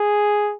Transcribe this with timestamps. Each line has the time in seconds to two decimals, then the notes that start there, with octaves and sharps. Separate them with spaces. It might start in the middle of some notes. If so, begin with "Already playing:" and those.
Already playing: G#4